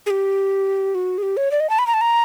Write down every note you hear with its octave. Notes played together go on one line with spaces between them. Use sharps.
G#4
G4
F#4
G#4
G4
C#5
D5
D#5
A5
B5
A#5
A5
A#5